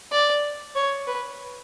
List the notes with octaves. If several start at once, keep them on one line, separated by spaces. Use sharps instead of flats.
D5
C#5
B4